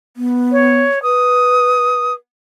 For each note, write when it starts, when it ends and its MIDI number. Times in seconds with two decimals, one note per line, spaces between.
0.17 0.80 59
0.52 1.02 73
1.03 2.10 71
1.03 2.13 87